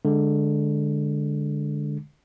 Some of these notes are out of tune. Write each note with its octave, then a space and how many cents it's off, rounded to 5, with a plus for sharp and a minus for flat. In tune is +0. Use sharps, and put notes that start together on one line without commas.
D3 +0 G#3 +0